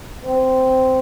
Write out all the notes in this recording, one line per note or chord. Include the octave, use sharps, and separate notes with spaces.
C4